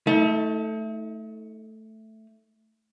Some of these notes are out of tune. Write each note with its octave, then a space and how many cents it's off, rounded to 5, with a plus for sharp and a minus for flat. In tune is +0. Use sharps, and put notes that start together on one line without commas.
A3 +0 D#4 +40